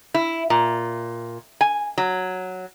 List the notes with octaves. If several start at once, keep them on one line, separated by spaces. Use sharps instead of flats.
E4
A#2
G#5
F#3